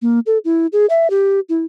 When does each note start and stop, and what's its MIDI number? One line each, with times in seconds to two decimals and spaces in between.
0.02 0.20 58
0.26 0.38 69
0.45 0.67 64
0.73 0.86 68
0.90 1.10 76
1.10 1.40 67
1.49 1.65 64